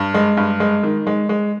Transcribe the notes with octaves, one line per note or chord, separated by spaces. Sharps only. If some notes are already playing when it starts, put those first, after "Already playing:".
Already playing: G2
G#3
G2
G#3
D#3
G#3
G#3